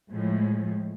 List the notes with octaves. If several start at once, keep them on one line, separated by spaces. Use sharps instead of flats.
A2 F3 G#3